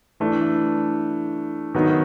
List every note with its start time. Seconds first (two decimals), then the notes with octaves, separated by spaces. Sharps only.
0.20 E3 A3 D4
1.75 D#3 F#3 B3 D#4